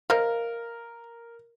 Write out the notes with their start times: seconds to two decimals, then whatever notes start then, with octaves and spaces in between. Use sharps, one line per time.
0.10 A#4 C5 D#5 F5